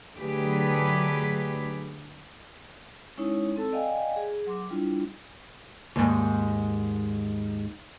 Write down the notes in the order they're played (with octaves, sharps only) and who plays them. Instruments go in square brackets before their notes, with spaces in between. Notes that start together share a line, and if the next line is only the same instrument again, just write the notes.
[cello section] D3 F#3 A3 G4 G#4 B4
[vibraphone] G#3 C#4 D#4 E4 C#5
C4 A4 A5 E6
D5 D#5 F5 G5 G#5
G#4
F#3 C6 D6
G3 D4 E4 F4
[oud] D#2 G#2